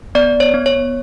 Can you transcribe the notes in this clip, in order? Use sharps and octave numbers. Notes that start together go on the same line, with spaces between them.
B3 D5
C#5
B3
C#5